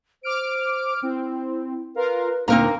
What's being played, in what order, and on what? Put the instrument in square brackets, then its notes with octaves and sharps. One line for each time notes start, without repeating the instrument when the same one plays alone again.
[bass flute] C5 [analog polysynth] D6 F6 D7
[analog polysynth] C4 [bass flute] E4
[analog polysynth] F4 A#4 F5 [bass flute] B4
[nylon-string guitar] D2 A#2 F5 [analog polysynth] A#3 [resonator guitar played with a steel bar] C4 A#4 A#5 [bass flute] D#4